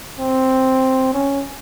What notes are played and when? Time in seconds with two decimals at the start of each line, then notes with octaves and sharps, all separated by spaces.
0.19 C4
1.14 C#4